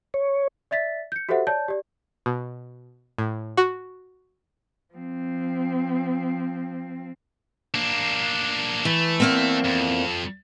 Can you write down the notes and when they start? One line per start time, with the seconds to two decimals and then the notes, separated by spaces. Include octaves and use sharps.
0.14 C#5
0.71 D5 E5 A6 B6
1.12 G6 C#7
1.29 F#4 G4 A4 C5 E5 F#5
1.47 C#5 D5 A5 G6
1.68 G4 D5
2.26 B2
3.18 A2
3.57 F#4
4.94 F3 C4
7.74 A#3 D4
8.85 E3 A3
9.20 E2 A#3 C4
9.64 F2